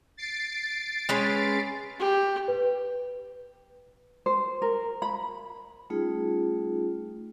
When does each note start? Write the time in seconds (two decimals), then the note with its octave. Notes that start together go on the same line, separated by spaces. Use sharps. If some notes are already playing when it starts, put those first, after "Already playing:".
0.17 A6 C7 D7
1.09 G#3 C#4 B4
1.99 G4
2.48 B4
4.26 C5
4.62 A#4
5.02 B5
5.90 G3 A3 C#4 D#4 F4 G#4